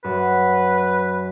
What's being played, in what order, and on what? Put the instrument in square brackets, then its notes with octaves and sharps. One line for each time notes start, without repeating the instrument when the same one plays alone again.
[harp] F#2 [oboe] B4